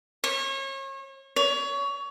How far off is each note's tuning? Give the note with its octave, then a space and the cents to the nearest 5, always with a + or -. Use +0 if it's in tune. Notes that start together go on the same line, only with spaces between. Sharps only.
C#5 -35
C#5 +25